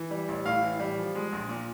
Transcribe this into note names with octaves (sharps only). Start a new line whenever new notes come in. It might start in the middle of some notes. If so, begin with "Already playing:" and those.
Already playing: E3
G3
A1
A2 F5
E3
G3
F3
G#3
A#1
A#2